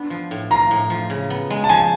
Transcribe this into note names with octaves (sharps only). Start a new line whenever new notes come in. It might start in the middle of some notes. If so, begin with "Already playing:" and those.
Already playing: B3 D4
F3
A2
F3 A#5
A2
F3
C#3
B3
G#3
A5
F3 G#5